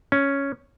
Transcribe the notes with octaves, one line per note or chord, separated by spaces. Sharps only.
C#4